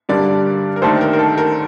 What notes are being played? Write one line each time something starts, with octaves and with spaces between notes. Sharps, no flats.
G2 D3 G3 D4 A#4 D5
A#4
D#2 D#3 A3 D4 A4 C5
A#4
A#4
A4
A#4